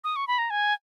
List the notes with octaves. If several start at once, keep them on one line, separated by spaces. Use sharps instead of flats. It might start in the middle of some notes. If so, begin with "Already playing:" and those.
D#6
C#6
B5
A#5
G#5